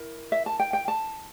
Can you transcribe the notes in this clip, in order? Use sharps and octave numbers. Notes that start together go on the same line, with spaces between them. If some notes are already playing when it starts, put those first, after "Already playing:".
Already playing: E4 A#4
E5
A5
G5
G5
A5